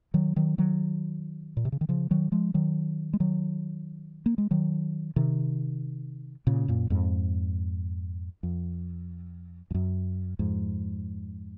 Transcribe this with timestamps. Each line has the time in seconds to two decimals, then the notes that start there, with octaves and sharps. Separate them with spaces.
0.14 D#3 F#3
0.36 D#3 F#3
0.58 D#3 F#3
1.57 A#2
1.65 C3
1.72 C#3
1.81 D#3
1.89 C#3 F3
2.11 D#3 F#3
2.32 F3 G#3
2.54 D#3 F#3
3.13 G#3
3.20 D#3 F#3
4.26 A#3
4.38 G#3
4.51 D#3 F#3
5.16 C3 D#3
6.47 A#2 C#3
6.68 F#2 A#2
6.90 F2 G#2
8.43 F2
9.71 F2
9.74 F#2
10.39 F2 G#2